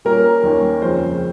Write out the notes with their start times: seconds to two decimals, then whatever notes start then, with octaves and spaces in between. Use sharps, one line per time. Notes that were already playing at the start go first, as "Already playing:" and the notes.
0.05 A#2 G3 A#3 C#4 A#4
0.43 D#2 D#3 A#3 C#4
0.82 F2 C#3 F3 G#3 C#4 C5